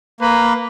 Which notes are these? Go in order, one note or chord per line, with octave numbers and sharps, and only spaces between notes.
A#3 B4